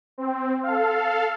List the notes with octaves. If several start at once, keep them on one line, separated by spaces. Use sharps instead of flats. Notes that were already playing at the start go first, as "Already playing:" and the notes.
C4
A4 F5